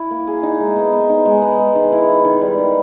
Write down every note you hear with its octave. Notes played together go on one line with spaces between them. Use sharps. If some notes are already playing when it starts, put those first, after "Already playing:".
Already playing: E4
A#3
G#4
D#4
G#3
B3
B3
D#4
G#3
B3
G#3
D#3
E4
E4
D#3
G3
D#3